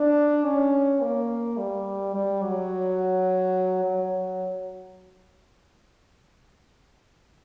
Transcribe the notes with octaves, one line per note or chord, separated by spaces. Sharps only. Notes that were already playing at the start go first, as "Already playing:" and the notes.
Already playing: D4
C#4
A#3
G3
G3
F#3
F#3